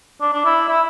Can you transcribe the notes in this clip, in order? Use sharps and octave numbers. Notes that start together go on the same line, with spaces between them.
D4
D4
E4
E4